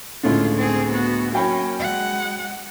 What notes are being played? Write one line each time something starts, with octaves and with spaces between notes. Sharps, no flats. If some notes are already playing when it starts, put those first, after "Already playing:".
C#2 A2 D3 F4
C4 G#4
B3 F#4
F#3 A#3 C#4 G5 B5
G#3 F#5